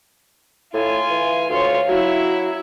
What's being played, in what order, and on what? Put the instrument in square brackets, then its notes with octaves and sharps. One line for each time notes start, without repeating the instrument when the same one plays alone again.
[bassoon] A2 [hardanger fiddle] F4 G#5
[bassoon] E3
[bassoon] D2 [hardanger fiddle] F4 C#5
[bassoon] F#3 [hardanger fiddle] E4 E5